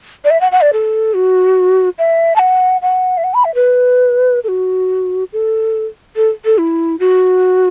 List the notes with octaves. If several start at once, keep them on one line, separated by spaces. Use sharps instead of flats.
D5
E5
F#5
F#5
D5
A4
F#4
E5
A5
F#5
F#5
E5
F#5
B5
E5
B4
A4
F#4
A4
A4
A4
E4
F#4